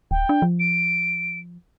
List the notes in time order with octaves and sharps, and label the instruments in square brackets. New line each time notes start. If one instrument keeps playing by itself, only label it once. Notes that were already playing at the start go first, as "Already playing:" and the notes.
[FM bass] D1 [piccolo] G5
[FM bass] D4
F3
[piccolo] D7